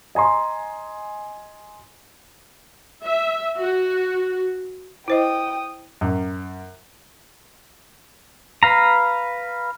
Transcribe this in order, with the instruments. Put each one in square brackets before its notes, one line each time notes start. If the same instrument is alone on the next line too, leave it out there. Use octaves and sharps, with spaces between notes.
[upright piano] D#5 G#5 A#5 C6
[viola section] E5
F#4
[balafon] E4 C5 D#5 [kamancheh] G5 D#6
[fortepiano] F#2
[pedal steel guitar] B4 F5 A#5